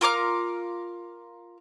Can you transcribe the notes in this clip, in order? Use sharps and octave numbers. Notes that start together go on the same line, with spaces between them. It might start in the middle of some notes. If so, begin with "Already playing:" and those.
F4 A#4 D6 F6